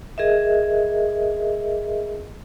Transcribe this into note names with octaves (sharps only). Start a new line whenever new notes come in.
G#4 A#4 D#5 E5